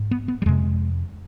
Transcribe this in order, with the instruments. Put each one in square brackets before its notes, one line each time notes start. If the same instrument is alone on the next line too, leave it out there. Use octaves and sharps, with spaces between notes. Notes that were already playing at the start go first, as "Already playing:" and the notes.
Already playing: [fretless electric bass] G#2
B3
B3
G3
F2 C3 G#3